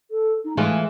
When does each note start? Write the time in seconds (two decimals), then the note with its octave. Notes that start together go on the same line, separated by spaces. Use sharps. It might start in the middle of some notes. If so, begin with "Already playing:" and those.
0.11 A4
0.45 D#4
0.57 E3 G#3 A3 F4